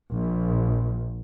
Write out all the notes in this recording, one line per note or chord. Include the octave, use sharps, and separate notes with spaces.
A#1